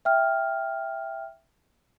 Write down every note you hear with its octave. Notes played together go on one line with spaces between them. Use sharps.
E5 G5 F6